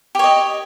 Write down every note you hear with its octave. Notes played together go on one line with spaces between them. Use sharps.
G4 C#5 D#5